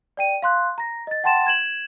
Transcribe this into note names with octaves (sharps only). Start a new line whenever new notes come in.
D5 G5 D#7
F5 C6 F#6
A#5 A#6
D#5 A6
F#5 G5 A5 C6 A6 E7
G#6 E7 F#7